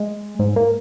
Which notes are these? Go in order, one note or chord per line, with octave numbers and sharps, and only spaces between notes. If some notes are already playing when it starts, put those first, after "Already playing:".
Already playing: G#3
G#2
A#3